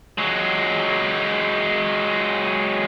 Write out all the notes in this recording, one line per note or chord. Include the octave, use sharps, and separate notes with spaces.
F#3 G#3